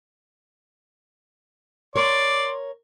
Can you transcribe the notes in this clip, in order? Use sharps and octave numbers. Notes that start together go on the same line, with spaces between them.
A#4 C#5 D5 C6